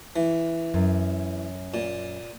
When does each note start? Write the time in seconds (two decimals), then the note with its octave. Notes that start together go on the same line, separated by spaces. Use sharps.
0.16 E3
0.74 F#2
1.74 A#2